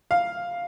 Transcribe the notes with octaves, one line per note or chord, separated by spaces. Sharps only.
F5